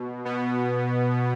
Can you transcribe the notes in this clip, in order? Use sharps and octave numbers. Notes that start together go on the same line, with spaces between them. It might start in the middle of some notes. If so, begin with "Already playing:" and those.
Already playing: B2
B2 B3